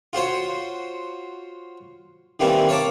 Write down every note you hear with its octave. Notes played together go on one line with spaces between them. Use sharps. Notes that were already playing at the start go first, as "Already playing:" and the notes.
F4 F#4 C5 C#5
D#3 E3 G3 A#3 C4 E4
C#5 F5 A5 A#5 D6